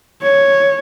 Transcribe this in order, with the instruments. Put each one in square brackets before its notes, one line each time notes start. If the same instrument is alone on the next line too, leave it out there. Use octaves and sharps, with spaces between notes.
[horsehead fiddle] C#5